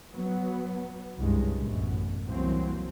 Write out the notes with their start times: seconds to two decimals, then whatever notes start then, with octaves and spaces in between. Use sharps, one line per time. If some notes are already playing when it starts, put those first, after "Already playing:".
0.12 F#3 B3
1.18 C2 G2 C#3 G#3
1.58 A1 F#2 B2
2.28 C2 E3 F#3 A#3 C4